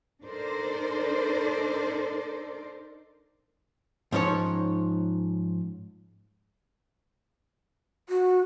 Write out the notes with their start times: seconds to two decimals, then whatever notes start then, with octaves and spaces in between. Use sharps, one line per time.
0.24 D4 D#4 A4 A#4 C5 D5
4.12 G#2 F3 C#4 D#4 G#4 C#5
8.09 F#4